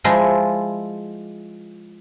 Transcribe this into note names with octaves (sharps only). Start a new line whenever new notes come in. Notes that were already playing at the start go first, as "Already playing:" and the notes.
F3 G#3 E4 F4